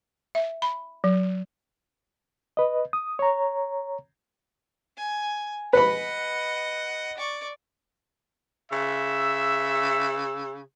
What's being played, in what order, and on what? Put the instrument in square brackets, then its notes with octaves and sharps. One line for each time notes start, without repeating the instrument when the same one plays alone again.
[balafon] E5
B5
F#3
[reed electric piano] B4 D#5
D#6
C#5 A#5
[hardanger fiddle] G#5
[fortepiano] B4 B5 [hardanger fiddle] D#5 F#5
[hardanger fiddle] D5 C#6
[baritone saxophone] C#3 [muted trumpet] E5 [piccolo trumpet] E6